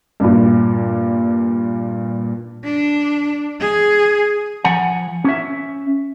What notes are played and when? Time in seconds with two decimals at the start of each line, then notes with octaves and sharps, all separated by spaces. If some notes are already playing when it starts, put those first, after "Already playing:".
0.20 G2 A#2
2.65 D4
3.61 G#4
4.65 F3 F#5 G#5
5.24 C#4 E5